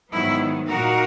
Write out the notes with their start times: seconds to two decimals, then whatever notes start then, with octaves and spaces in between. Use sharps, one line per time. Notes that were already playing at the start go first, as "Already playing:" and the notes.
0.12 G#2 D#3 F#3 B3 E4
0.69 A#2 A#3 D#4 F#4 A#4